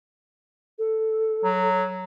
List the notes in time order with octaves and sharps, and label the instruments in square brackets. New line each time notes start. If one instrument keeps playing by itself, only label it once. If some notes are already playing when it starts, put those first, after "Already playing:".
[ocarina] A4
[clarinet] F#3